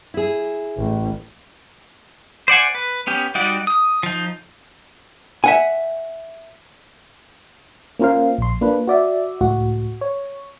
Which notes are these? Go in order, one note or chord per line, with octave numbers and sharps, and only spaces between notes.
E4 G#4
A1 A2
C5 D5 F#5 G#5
B4
B3 C#4 G4
G3 D#4 F#4 G4 D5
D#6
F3 D#4
E5 F#5 G#5
A#3 C#4 F4 A#4 C5 F5
A#1 C6
A#3 D4 F4 B4
F#4 D5 E5
C#2 A2 F#4
C#5